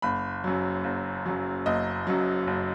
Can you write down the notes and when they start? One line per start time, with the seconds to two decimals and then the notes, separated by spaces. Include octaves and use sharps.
0.02 F#1 B5
0.44 F#2 F#3
0.84 F#1
1.26 F#2 F#3
1.66 F#1 D#5
2.07 F#2 F#3
2.47 F#1